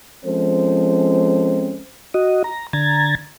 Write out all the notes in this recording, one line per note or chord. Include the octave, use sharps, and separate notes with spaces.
F3 G#3 C4 C#4 A4 C5
F#4 D#5
A#5
D3 A#5 G#6 A6